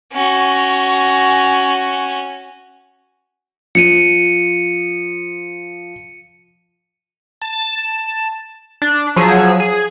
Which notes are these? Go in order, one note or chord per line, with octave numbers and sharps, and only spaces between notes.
C#4 F#4
F3 C#7 D#7
A5
D4
F3 F#3 G#4 E6
G#4